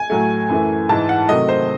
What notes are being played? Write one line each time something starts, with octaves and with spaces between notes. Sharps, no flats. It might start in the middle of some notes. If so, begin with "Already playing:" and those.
Already playing: G#5
A2 F#3 A3
F#2 E3 A3
G#2 E3 G#3 A5
F#5
C3 D#3 F#3 A3 D#5
C5